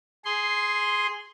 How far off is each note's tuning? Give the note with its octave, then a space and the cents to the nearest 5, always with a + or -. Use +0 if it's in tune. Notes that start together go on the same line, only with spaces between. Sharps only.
G#4 +0 C6 +0